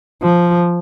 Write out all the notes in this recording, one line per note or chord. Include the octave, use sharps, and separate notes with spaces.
F3